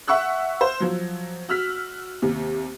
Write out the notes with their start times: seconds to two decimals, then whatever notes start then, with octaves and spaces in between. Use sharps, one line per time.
0.08 E5 F#5 C#6 E6 F#6
0.61 C5
0.80 F3 F#3
1.49 F#4 E6 F6 B6
2.22 D#2 C3